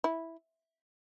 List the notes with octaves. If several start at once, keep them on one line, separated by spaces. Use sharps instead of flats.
E4